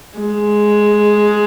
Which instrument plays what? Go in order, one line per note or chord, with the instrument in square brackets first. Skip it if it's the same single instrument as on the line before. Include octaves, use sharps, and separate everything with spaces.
[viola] G#3